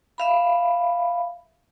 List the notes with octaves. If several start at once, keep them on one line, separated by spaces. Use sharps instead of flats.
E5 F5 B5